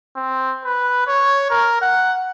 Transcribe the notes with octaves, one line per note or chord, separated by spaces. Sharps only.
C4
B4
C#5
A#4
F#5